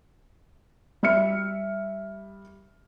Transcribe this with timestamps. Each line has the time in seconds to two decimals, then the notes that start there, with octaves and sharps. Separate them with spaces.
1.03 G3 E5 F6 C#7